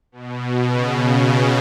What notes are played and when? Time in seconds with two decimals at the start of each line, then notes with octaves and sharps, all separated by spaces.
0.12 B2
0.70 C#3